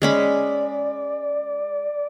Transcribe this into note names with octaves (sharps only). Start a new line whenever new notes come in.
G#3 C#4 D5 B5